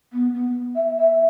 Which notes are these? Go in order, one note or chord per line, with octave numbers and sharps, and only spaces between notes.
B3
B3
E5
E5